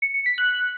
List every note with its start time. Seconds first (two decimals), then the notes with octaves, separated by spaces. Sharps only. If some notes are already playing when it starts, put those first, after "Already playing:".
0.02 C#7
0.14 C#7
0.26 B6
0.38 F#6